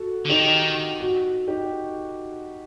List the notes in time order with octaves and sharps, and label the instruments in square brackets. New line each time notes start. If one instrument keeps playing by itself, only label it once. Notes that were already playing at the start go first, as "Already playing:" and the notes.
Already playing: [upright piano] F#4 A4
[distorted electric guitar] D3
[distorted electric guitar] D#3 [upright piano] D#4 G4
[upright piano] F#4
D#4 G4